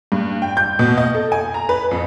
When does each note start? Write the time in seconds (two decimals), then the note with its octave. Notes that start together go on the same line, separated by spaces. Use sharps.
0.12 G2
0.42 G5
0.57 G6
0.79 B2
0.98 D#5
1.15 A4
1.32 G#5
1.54 A#5
1.69 B4
1.91 F2